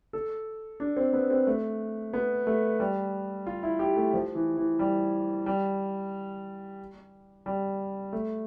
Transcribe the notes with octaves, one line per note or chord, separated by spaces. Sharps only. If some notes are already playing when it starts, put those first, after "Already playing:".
A4
D4
C4
B3
C4
A3
B3
A3
G3
F4
E4
G4
A3
F3
E3
E3
G3
G3
G3
A3